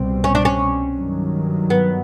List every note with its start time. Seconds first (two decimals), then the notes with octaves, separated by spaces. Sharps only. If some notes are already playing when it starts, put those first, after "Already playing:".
Already playing: C2 B2 G3 C4
0.24 C#4
0.35 D4
0.45 C#4
0.97 G2 D#3 F#3
1.70 B3